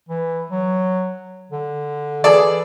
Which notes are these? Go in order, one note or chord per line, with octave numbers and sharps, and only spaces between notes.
E3
F#3
D3
E3 G#4 A4 D5